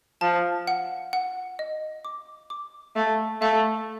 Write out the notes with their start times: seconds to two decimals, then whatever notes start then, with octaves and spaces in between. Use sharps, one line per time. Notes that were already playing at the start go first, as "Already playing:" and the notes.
0.21 F3 A5
0.67 F#5
1.13 F#5
1.59 D#5
2.05 D6
2.50 D6
2.96 A3 F5
3.41 A3 F5